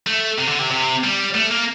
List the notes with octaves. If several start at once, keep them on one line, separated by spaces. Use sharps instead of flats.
A3
C3
D3
C3
C3
G3
A3
A#3